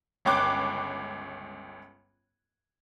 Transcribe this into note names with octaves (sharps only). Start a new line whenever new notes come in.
G1 C#2 C#5 G5 D6 F#6